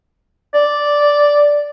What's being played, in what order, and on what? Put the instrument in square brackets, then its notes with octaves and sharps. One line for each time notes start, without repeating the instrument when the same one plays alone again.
[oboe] D5